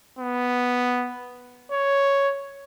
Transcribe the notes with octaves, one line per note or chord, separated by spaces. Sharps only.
B3
C#5